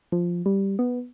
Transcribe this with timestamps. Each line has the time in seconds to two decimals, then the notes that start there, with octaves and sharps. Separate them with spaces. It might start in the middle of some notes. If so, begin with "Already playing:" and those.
0.12 F3
0.46 G3
0.79 B3